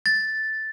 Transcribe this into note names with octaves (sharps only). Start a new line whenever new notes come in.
A6